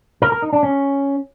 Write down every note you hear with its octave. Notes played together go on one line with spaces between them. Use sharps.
A#4
A#4
D#4
D4
C#4